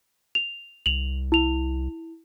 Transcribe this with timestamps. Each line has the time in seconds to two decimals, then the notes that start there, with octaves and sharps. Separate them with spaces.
0.35 F7
0.86 C2 F7 F#7
1.32 E4 F7